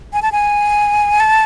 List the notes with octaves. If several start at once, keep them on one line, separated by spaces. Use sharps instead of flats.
G#5
A5
G#5
A5